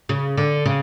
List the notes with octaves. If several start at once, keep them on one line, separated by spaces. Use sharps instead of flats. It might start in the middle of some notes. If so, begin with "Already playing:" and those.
C#3
D3
C#3